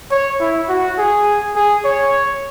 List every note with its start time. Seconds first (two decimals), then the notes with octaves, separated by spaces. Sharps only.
0.11 C#5
0.40 E4
0.69 F#4
0.98 G#4
1.55 G#4
1.85 C#5